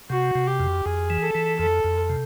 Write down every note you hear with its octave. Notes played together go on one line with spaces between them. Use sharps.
C3 F#4
C3
G4
F2
F2 G#4
E3
A4
E3
F2 A4
F2
C3